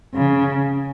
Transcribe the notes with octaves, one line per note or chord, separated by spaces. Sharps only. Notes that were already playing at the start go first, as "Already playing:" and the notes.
C#3